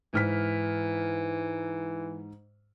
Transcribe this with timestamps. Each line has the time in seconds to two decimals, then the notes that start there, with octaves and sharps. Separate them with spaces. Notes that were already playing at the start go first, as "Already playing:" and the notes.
0.14 G#2 E3 F6 B6